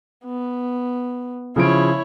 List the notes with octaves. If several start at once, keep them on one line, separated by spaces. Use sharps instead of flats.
B3
C#3 F3 E4 C#5 D7